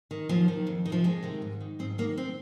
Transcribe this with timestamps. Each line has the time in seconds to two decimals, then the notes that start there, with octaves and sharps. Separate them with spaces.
0.11 D#3
0.29 D#2 F3
0.48 D#3
0.67 F2
0.85 D#3
0.90 C3 F3
1.04 F2 G#3
1.23 C3 D#3
1.42 G#2
1.60 D#3
1.79 G#2 C4
1.98 D#3 A#3
2.17 C4